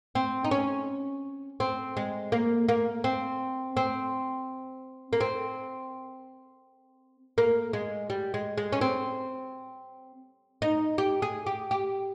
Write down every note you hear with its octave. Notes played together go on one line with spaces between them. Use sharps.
C4
D#4
C#4
C4
G#3
A#3
A#3
C4
C4
A#3
C4
A#3
G#3
G3
G#3
G#3
C#4
C4
D#4
G4
G#4
G4
G4